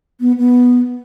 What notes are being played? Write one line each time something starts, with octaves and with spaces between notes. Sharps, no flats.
B3
B3